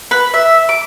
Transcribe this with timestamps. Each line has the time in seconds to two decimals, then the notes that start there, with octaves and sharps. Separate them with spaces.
0.11 B4
0.34 E5
0.69 D6